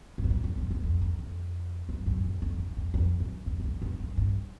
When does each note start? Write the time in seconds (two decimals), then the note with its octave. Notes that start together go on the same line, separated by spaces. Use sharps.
0.18 G2
0.24 F2
0.30 F#2
0.44 F2
0.58 F#2
0.71 F2
0.83 F2
1.01 F2
1.19 F2
1.89 F#2
2.06 F#2
2.24 F2
2.42 F2
2.58 E2
2.77 F2
2.94 F2
3.20 F#2
3.46 F2
3.60 F#2
3.64 F2
3.82 E2
4.00 F#2
4.17 G2